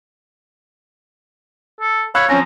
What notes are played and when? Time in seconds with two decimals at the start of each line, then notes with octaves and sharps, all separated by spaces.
1.81 A4
2.15 C#5 F5 B5 E6 F#6
2.29 F3 C4 C#4 A#5